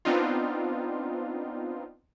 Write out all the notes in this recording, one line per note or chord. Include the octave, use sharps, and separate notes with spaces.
B3 C4 D4 D#4 F4